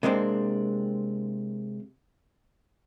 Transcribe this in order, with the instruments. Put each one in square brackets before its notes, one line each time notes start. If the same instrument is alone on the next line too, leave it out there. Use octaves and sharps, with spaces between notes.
[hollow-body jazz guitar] C3 G#3 A#3 C4 D4